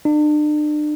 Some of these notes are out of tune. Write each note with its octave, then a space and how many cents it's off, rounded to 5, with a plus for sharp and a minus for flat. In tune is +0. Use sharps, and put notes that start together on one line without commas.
D4 +40